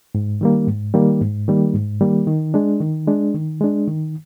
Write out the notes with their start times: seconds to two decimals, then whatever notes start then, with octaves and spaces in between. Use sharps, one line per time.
0.15 G#2
0.41 D#3 G3 A#3
0.67 G#2
0.94 D#3 G3 A#3
1.21 G#2
1.48 D#3 G3 A#3
1.74 G#2
2.00 D#3 G3 A#3
2.27 D#3
2.54 G#3 D4
2.81 D#3
3.07 G#3 D4
3.34 D#3
3.61 G#3 D4
3.88 D#3